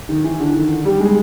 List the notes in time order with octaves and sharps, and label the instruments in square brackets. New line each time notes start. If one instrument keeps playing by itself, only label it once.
[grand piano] D#3
E3
D3
D#3
G3
G#3